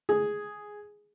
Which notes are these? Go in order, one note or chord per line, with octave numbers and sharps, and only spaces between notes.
G#4